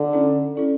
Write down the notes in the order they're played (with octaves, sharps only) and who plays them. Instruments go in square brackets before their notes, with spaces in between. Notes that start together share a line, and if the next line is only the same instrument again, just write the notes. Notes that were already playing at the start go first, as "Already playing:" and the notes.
Already playing: [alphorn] D3
[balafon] C#4 E4 A4 D5
C#4 E4 A4 D5